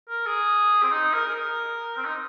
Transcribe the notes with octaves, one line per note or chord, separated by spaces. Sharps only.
A#4
G#4
C4
D#4
A#4
G#4
A#4
C4
D#4